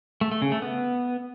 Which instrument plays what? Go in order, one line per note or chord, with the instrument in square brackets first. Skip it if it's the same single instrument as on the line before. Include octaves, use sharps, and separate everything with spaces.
[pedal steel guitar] A3
A3
C#3
A3
B3